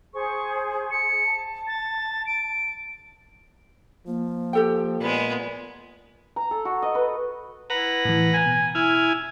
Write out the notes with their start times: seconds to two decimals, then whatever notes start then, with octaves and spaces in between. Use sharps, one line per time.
0.14 G#4 C5 C#6
0.91 C#7
1.24 A5
1.67 A6
2.27 D7
4.07 F3 A#3
4.53 G4 A4 G5
5.00 A#2 G#3 B3
6.36 A#5
6.51 A4
6.65 F#4
6.82 D#5
6.95 B4
7.70 E4 B4 F#5 A#5
8.05 A2 E3
8.34 G#5
8.46 B2
8.75 E4 G#5 F6